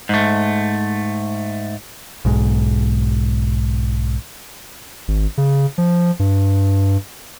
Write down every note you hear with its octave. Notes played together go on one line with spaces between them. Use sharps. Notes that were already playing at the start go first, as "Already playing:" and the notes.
G#2 A3
B1 G#2
G#1
C#3
F3
G2